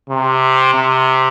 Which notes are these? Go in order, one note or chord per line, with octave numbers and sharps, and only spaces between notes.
C3
C3